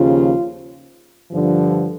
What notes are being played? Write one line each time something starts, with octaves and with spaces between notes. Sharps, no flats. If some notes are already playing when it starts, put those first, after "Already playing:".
Already playing: D#2 C#3 F3 F4
G2 D3 F3